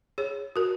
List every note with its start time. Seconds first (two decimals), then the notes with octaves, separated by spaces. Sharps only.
0.18 G#4 C#5
0.56 F#4 A#4